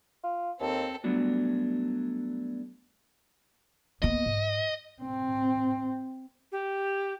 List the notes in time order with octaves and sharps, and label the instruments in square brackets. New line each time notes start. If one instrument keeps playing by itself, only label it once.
[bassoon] F4
[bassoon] D#2 [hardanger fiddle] C4 A4
[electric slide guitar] F#3 G3 A3 B3 D4 F#4
[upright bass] A#3 B3 [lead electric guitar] D#5
[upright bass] G#2
[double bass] C4
[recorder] G4